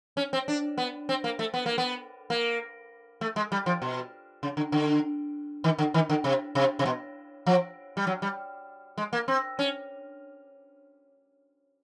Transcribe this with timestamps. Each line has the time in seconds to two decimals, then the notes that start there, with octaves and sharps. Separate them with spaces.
0.17 C#4
0.33 C4
0.48 D4
0.78 B3
1.09 C4
1.24 A#3
1.39 A3
1.54 B3
1.66 A#3
1.78 B3
2.30 A#3
3.21 A3
3.36 G#3
3.52 G3
3.66 F3
3.82 B2
4.43 C#3
4.57 D3
4.72 D3
5.64 D#3
5.78 D3
5.94 D#3
6.10 D3
6.24 C3
6.55 C3
6.79 C3
6.86 B2
7.47 F3
7.97 G3
8.07 F#3
8.22 G3
8.98 G#3
9.13 A#3
9.28 C4
9.59 C#4